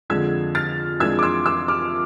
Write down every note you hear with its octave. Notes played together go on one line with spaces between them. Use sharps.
F2 D3 F3 G#3 E6 G#6
F6 A6
F2 E3 G#3 D4 F4 E6 G#6
D6
C6 E6
C6 E6
D6 F6